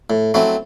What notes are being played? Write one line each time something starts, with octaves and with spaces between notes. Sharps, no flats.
A2
F#3 A3 C4 E4